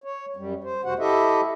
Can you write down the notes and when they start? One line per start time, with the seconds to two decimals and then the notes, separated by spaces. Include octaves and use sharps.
0.04 C#5
0.36 F#2 G3
0.64 C5
0.85 F2 C3 F#4 C5 F#5
0.99 E4 G4 A4 D#5 E5